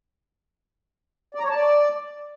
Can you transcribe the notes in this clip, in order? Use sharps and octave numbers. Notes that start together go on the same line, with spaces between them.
D5
A#5
C#5
A5
D5